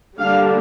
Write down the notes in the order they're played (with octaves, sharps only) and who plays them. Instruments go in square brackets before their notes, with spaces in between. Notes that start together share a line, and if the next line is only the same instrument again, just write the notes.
[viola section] D3 G3 A#3 D4 F5